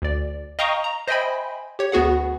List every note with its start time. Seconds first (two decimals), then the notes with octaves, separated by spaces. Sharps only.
0.02 D2 D5
0.59 D#5 F5 G5 A#5 C#6 D#6
0.84 A#5
1.08 C5 D#5 E5 G5 G#5 B5
1.79 G4 C#5
1.92 D2 B3 F#4 G#4 F#5